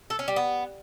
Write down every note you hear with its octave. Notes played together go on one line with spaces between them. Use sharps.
A4
C#4
G3
B3